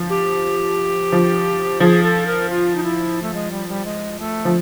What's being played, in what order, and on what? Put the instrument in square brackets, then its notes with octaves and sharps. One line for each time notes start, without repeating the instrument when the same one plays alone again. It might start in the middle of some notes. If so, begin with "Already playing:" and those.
Already playing: [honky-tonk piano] F3
[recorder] G4
[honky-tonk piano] F3
[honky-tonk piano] F3 [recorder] G#4
[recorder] A4
A#4
F4
D#4
E4
A3
G#3
G3
G3
G#3
A3
[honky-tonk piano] F3